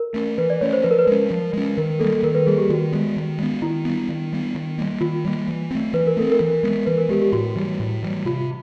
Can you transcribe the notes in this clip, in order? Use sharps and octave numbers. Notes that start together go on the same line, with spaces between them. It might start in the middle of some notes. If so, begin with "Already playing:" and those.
Already playing: A#4
A3 C#4
E3 B4
D5
A3 C#4 C#5
C5
F3 B4
A#4
B4
G#3 C#4
F3
G#3 C#4
D#3 A#4
G3 A#3 A4
D#3 A#4
B4
G3 A#3 G#4
G4
D#3 F#4
G#3 B3
D#3
G#3 B3
D#3 E4
G3 B3
D#3
G3 B3
D#3
G3 A#3
D#3 F4
G3 A#3
E3
A3 C4
E3 B4
A#4
A3 C4 A4
A#4
E3
G#3 B3
E3 B4
A#4
G#3 B3 G4
G4
A2 F#4
E3 G3
A2
E3 G3
C3 F4